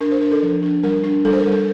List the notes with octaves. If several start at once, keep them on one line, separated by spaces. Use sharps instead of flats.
D4 A#4
C5
D4 A#4
A4
F3
D4
G3 A#4
D4
G3 A4
C5
A#4
G3
A4